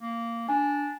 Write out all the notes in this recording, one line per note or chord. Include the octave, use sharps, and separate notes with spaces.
A#3
D4 G#5